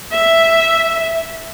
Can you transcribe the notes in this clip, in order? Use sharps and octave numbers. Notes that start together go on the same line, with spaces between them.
E5